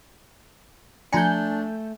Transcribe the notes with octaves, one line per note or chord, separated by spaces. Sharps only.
F3 A3 D4 G#5 A#5 G6 C#7